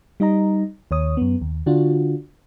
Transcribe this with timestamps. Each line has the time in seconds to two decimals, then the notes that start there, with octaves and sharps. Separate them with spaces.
0.20 G3 D#4 D#5 A#5
0.91 D#2 C#5 D#6
1.17 F#2 B3
1.41 D#2
1.66 D3 D4 F4 F#4